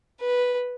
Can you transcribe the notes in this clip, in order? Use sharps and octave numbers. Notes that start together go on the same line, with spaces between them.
B4